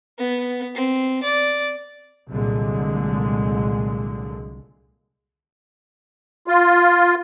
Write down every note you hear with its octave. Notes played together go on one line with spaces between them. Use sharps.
B3
C4
D5
C2 A#2 D3 F#3 G#3
F4